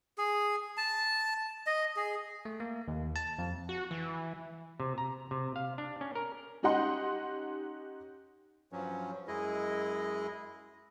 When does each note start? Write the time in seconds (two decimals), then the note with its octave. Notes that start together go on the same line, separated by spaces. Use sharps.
0.18 G#4
0.77 A5
1.66 D#5
1.96 G#4
2.45 A3
2.60 A#3
2.88 D#2
3.16 A5
3.38 F2
3.69 F#4
3.91 E3
4.80 C3
4.98 A#5
5.31 C3
5.56 F5
5.78 D4
6.01 C#4
6.15 A#4
6.63 C#4 D#4 G4 D#5 F#5 C6
8.72 G2 F3 F#3 C#4
9.28 F#2 G#3 E4 G#4 D#5